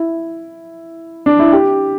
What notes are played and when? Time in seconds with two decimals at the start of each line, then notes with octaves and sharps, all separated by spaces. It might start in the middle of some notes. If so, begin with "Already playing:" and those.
Already playing: E4
1.26 D4
1.40 E4
1.52 G4